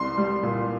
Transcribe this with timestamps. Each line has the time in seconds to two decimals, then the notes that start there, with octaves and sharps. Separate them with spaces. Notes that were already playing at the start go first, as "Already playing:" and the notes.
Already playing: C2 C6
0.18 G3
0.43 A#2